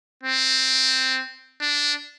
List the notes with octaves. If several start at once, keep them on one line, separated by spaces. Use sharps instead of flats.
C4
D4